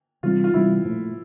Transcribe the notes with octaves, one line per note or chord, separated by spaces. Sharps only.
C3 E3 G3 C4 F4
F4
C3 E3 G3 C4 E4
A#2 F3 A3